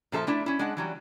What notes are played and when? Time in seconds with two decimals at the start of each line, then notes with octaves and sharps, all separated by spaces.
0.12 A#2 F3 A4 E5 A5
0.27 A3 D4 E4
0.46 C#4 E4
0.59 G#3 D4 F#5
0.77 E3 F#3 G3